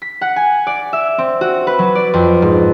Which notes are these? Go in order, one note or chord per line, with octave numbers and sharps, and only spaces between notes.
B6
F#5
G#5
D5
E5
C4
F#4
B4
F#3
D5
F2
G#2